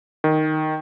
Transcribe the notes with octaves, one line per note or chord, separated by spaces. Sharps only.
D#3